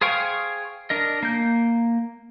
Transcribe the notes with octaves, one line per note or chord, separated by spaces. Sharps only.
G#4 C5 F5 G5 C#6
D4 A#4 D#5
A#3 G6